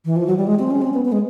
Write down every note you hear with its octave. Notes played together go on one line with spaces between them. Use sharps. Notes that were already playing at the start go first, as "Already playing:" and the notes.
E3
F3
F#3
G3
G#3
C4
C#4
C4
B3
B3
G#3